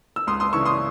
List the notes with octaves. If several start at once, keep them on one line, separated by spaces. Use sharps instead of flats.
E6
C#2 C6 D#6
C6 D#6
C#3 E3 C#6 E6
C6 D#6